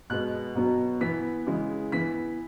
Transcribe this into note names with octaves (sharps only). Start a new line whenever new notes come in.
B2 G#3 B3 F#6
B2 F#3 B3
E3 B3 B6
C#3 E3 G#3
E3 B3 B6